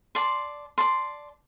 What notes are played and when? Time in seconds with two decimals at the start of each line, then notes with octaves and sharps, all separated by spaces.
0.15 D5 A5 C6
0.78 D5 A5 C6